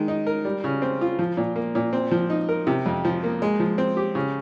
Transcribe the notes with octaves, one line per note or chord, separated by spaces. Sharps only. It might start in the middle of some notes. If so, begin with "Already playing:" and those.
Already playing: D#3 G#3
D#4
A#4
G3
C#3
C4
F4
F3
A#2
A#3
A#2
C4
F3
D#4
A#4
C3
F2
F3
A#3
G#3
F3
C4
G4
C#3